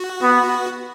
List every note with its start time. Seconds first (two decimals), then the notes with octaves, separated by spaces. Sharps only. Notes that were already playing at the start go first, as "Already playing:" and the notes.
Already playing: F#4
0.23 B3